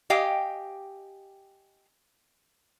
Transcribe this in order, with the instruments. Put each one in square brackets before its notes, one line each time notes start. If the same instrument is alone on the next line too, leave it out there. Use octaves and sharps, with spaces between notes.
[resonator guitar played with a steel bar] G4 D#5 F5 G5 G#5